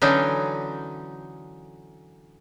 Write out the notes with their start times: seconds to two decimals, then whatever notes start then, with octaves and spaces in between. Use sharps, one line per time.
0.02 D3 E3 F#3 C#4 D#4